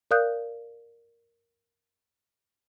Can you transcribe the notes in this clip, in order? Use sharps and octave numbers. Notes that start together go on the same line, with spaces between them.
A#4 D5 F5 D#6 F#6 G6